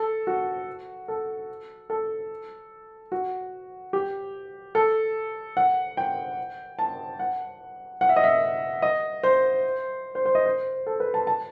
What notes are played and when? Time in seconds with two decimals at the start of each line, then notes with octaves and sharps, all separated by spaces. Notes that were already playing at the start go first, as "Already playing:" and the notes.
Already playing: A4
0.27 F#4
1.08 A4
1.90 A4
3.12 F#4
3.93 G4
4.75 A4
5.57 F#5
5.97 G5
6.79 A5
7.19 F#5
8.01 F#5
8.09 E5
8.16 D#5
8.24 E5
8.82 D#5
9.23 C5
10.15 C5
10.25 C5
10.35 D#5
10.46 C5
10.87 A4
11.00 B4
11.14 A5
11.27 A5